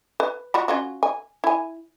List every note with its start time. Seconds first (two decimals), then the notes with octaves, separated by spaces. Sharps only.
0.20 B4
0.54 F4 F#4 B5
0.68 C#4 F4 F#4
1.03 G#5
1.44 E4 G#5